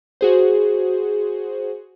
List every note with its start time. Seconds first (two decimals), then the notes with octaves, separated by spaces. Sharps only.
0.21 F#4 G#4 C5